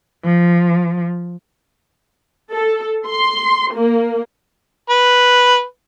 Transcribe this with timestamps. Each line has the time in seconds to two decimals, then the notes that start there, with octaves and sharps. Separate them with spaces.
0.24 F3
2.52 A4
3.06 C6
3.73 A#3
4.89 B4